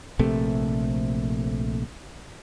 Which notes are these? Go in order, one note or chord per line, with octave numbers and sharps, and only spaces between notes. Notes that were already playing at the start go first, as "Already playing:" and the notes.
A#1 C3 A3